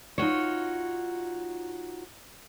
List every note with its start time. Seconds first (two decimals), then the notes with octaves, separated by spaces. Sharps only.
0.18 D#4 F4 F#4 C#5